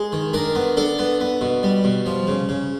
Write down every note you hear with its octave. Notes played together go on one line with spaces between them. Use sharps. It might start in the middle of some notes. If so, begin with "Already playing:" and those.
Already playing: G#3
D#3
D4 A#4
B3
D4 A4
B3
B3
B2
G3
B2
F3
C#3
C#3